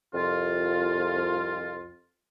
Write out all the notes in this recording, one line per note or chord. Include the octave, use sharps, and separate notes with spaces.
C2 F2 F4